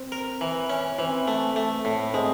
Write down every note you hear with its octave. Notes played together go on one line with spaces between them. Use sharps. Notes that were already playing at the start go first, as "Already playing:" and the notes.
Already playing: C4
A#4
E3
C#4
E3 C4
A3
A3
A2
G#3 C4